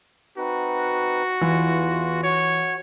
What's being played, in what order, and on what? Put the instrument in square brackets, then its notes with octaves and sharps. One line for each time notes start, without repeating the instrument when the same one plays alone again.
[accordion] C4 D#4 B4 [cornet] F#4
[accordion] E2 F4 [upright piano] E3
[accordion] F#4 [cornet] C#5